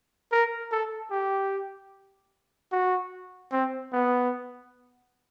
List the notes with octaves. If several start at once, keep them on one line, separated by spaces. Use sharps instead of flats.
A#4
A4
G4
F#4
C4
B3